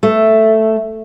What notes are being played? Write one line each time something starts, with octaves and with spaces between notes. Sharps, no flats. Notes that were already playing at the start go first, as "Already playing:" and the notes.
A3